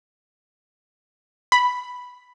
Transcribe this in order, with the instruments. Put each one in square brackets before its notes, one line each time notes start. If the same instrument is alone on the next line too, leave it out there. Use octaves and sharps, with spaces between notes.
[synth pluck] B5